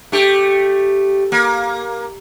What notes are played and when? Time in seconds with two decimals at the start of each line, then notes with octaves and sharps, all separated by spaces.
0.12 A3 G4
1.32 A#3